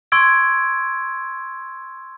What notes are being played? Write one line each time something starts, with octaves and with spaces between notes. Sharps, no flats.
C6 C#6 E6 G#6 D7